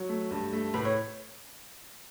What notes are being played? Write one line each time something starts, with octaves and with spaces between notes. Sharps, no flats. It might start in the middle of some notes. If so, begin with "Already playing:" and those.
Already playing: F#3
A3
G2
A3
A2 B4
C#5